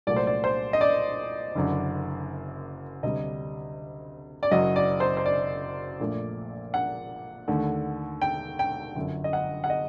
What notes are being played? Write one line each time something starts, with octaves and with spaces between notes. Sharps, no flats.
C2 A#2 F#3 A3 D5
C5
D5
C5
D#5
D5
F#1 F#2 D3
D2 C3 G3 D#5
D5
F#1 F#2 F#3 D#5
D5
C5
C5
D5
A#1 A#2 A3
F#5
D#2 D3 A3
G5
G5
G1 F#2 D3
D#5
F#5
F#5
D#5